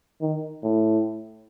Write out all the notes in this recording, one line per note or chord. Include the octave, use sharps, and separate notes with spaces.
D#3
A2